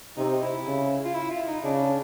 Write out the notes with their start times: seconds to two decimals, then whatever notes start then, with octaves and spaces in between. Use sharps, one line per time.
0.17 C3 D#4
0.42 E4
0.66 C#3
1.04 F4
1.15 E4
1.31 F4
1.47 D#4
1.64 C#3 D4